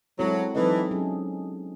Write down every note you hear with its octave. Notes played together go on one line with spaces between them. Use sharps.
F#3 G#3 C4 E4 A4 C#5
E3 F#3 C4 D#4 A4 D#5
F#3 C#4 G#4